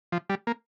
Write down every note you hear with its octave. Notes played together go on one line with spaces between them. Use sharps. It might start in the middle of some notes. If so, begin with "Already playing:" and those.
F3
G3
A#3